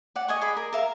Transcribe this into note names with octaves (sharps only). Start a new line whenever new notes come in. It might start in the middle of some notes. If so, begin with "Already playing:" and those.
D5 F#5
D#5 G#5 C#6
G#4 D5 B5
A#4
A#4 E5 F5